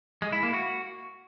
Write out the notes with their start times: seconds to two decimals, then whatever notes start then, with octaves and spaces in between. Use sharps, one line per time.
0.22 G#3
0.32 E4
0.43 A#3
0.53 F#4